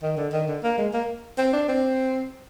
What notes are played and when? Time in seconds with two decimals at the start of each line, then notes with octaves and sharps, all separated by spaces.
0.03 D#3
0.17 D3
0.33 D#3
0.48 D3
0.63 A#3
0.78 G#3
0.93 A#3
1.38 C4
1.53 D4
1.68 C4